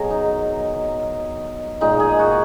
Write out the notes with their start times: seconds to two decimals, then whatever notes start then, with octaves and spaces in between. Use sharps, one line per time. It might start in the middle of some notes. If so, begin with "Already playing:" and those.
Already playing: B2 F#3 G#4 A#4
0.10 D#4
1.81 A#2 G#3 D#4
2.00 G#4
2.19 F#4